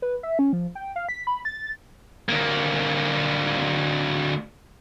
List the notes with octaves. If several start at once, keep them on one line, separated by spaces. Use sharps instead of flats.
B4
E5
C#4
F3
G5
F5
B6
B5
A6
D2 A#3